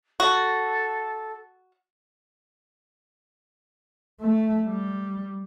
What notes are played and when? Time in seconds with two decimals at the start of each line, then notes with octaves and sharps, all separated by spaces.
0.20 F#4 A4
4.20 A3
4.67 G3